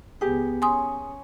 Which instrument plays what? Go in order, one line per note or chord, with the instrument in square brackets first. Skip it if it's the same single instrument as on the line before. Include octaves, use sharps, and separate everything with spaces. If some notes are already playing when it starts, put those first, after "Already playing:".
[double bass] C#2 B3 [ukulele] G4 G#4
[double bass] C#4 [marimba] G#5 C6 D#6